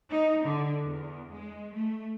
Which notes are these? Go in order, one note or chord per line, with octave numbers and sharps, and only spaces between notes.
D#4
D3
E2
G#3
A3